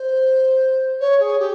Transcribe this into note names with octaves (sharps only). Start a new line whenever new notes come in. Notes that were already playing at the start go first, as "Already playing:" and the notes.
Already playing: C5
C#5
G#4
G4